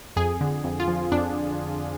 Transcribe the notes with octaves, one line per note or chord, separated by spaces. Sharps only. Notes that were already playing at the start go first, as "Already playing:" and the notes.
F2 G#4
D3
F2
F4
F3
F2 D4